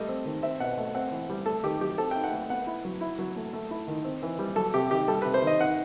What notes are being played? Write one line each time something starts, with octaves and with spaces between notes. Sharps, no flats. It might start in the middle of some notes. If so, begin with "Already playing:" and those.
Already playing: G3 A3 D#5
C4
D#3
C4 E5
B2 F#5
A3
C4 F#5
E3
G3
A3 A4
D#3 G4
F#3 G4
C4 A4
D#4 G5
F#5
A3
B3 F#5
E4
F#3
E4
F#3
A3
A3
E4
D#3
C4
E3
G3
F#3 A4
C3 G4
D#3 G4
G3 A4
C3 B4
C5
D#3
D#5
D#4 F#5